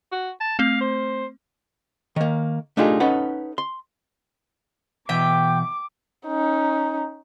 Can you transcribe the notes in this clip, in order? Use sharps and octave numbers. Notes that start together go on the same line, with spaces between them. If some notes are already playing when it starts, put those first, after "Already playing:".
F#4
A5
A3 C4 F5
C5
D#3 A#3
A3 D4 D#4 F4 G4 G#4
C#4 D#4 A4 B4 F#5
C6
B2 E3 E5 G5 D6
C#4 D#4